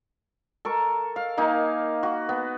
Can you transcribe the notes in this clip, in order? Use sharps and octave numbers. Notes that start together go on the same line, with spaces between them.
A4 A#4 C#6
F5
A#3 D#4 F5 G#5
F#4
B3